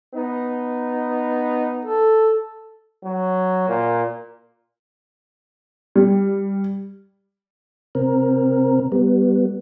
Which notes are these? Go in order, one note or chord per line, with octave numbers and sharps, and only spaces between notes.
B3 D#4
A4
F#3
A#2
G3
C3 C4 A#4
G3 B3